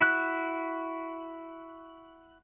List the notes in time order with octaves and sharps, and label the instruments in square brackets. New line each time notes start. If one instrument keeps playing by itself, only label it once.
[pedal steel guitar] E4 F#4 F#6